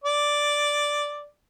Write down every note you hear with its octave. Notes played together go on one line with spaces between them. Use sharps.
D5